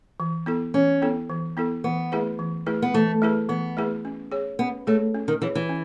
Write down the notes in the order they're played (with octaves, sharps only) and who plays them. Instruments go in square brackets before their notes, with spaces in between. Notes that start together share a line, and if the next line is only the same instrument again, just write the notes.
[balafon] E3
B3 E4 A4
[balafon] E3 [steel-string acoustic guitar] C#4
[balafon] B3 E4 A4
E3
B3 E4 A4
[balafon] E3 [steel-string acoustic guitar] B3
[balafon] A3 E4 G#4 B4
E3
A3 E4 G#4 B4
[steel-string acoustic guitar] B3
[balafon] E3 [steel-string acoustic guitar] A3
[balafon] A3 E4 G#4 B4
[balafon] E3 [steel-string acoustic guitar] B3
[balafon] A3 E4 G#4 B4
C#4
G#4 C#5
[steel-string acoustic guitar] B3 [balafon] C#4
[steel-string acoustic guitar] A3 [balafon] G#4 C#5
[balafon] C#4
[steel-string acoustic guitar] D#3
[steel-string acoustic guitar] E3 [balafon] G#4 C#5
[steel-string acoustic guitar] E3
[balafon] C#4